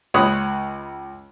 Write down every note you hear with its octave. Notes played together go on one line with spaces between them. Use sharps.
C#2 C#5 B5 D#6 F#6